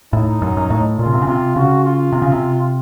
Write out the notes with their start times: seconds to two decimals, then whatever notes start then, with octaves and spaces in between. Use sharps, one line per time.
0.13 A2 D#4
0.42 F#2
0.57 F#2
0.70 A2
0.99 A#2 F4
1.06 C#3
1.13 C3
1.22 C#3
1.27 C3 F4
1.56 C#3 F#4
1.85 F4
2.12 C3
2.22 C#3
2.32 C3